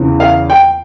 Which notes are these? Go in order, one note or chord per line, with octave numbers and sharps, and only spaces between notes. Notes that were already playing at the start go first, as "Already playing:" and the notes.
Already playing: E2 C#3 E3
F5
G5